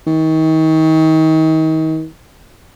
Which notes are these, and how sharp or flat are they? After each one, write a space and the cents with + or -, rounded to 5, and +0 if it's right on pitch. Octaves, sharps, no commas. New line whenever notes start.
D#3 +35